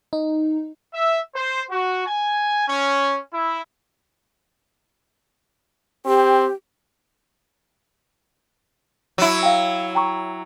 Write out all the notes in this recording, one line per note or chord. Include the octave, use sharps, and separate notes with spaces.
D#4
E5
C5
F#4
G#5
C#4
E4
C4 G4
F#3 E4
F5 G5
G5 A#5 C#6